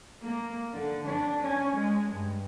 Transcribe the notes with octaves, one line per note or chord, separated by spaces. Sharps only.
A#3
D3
D4
C#4
G#3
G2